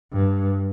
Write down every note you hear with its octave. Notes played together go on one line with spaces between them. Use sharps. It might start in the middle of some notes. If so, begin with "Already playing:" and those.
G2